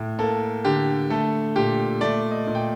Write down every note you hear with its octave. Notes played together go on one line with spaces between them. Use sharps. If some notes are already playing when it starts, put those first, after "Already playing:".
Already playing: A2
A#3 A4
D3 G4
A3 A4
A#2 G4
A3 D5
D#5
A#2
G5